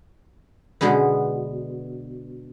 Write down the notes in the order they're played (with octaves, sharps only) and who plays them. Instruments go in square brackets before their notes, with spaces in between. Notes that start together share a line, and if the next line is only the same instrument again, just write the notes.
[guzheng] B2 D3 G#3 B3